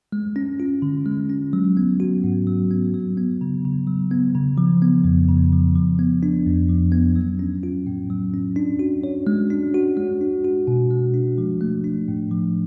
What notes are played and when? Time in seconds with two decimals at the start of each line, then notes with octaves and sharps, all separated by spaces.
0.12 G#3
0.36 C#4
0.60 F4
0.82 D3
1.06 G#3
1.30 C#4
1.53 F#3
1.77 B3
2.00 F#4
2.24 G#2
2.47 F#3
2.71 B3
2.94 F#3
3.17 B3
3.41 C#3
3.65 C#3
3.88 F#3
4.11 B3
4.35 C#3
4.58 F3
4.82 B3
5.04 F2
5.29 C#3
5.52 F3
5.75 F3
5.99 B3
6.23 D4
6.46 F2
6.69 F3
6.92 B3
7.16 F#3
7.39 C#4
7.63 F4
7.87 A2
8.10 F#3
8.34 C#4
8.56 D4
8.79 F#4
9.04 C#5
9.27 G#3
9.50 D4
9.74 F#4
9.97 G#3
10.21 D4
10.45 F#4
10.67 B2
10.91 G#3
11.14 D4
11.38 F3
11.61 A3
11.84 D4
12.08 A2
12.31 F3